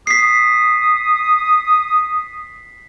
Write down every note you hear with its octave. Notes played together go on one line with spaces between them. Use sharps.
D#6 B6 C7